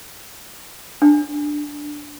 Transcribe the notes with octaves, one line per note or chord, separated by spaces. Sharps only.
D4